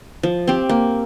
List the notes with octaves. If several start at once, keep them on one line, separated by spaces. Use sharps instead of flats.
F3
C4 G4
A#3